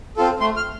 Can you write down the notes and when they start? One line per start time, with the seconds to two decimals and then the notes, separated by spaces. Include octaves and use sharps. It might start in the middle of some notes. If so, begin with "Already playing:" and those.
0.17 C4 F4 A4
0.40 A3 C6
0.57 F6